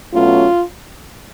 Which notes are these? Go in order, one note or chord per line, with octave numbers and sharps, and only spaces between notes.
B2 F#3 A3 C#4 F4